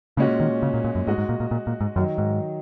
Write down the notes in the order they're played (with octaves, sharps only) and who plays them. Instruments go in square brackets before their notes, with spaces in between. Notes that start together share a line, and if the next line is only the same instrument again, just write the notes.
[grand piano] A#2 G#3 C#4 F#4 [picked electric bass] C#3
[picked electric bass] D#3
C#3
A#2
A#2
F#2
[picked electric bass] G#2 [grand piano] G#3 F#4 D#5
[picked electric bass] G#2
A#2
A#2
A#2
A#2
G#2
[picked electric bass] F#2 [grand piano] D#3 F#3 D#4
[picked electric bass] G#2